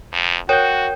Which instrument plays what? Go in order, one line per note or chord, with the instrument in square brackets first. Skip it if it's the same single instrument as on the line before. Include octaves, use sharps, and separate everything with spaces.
[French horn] F2
[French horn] F#4 [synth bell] A#4 C#5 [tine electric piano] G5 G6